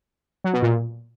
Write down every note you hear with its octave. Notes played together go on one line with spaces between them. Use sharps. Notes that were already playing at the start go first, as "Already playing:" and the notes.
F#3
B2
A#2